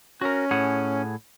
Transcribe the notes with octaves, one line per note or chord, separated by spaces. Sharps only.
C#4 F#4 A#4
A2 G#4 F#5